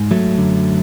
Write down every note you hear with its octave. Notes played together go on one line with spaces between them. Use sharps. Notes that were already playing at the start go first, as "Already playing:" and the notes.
Already playing: G#2
F#3 A3
F#2 D3